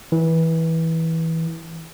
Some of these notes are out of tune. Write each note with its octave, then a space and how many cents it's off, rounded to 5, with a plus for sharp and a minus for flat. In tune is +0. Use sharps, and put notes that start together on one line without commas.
E3 -20